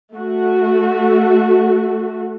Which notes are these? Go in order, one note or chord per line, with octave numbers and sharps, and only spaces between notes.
A3 F#4